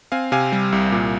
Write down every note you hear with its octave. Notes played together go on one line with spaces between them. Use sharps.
C4 F5 G#5
C3 F5 G#5
G3
C2
A#2